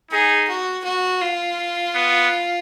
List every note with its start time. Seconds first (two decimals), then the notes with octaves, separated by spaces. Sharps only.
0.11 D#4 G#4
0.48 F#4
0.84 F#4
1.21 F4
1.95 B3